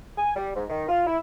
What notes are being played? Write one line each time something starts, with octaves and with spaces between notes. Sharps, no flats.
G#5
G3
G#2
D#3
F4
E4